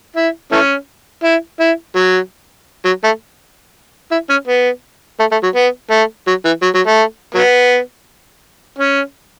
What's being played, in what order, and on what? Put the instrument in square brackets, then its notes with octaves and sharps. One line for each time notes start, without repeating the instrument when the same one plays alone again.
[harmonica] E4
E3 A3 C#4
E4
E4
F#3
F#3
A3
E4
C#4
B3
A3
A3
F#3
B3
A3
F#3
E3
F#3
F#3
A3
F#3 B3
C#4